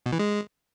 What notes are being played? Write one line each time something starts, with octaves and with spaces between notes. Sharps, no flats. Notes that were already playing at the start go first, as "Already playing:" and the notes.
B2
E3
G#3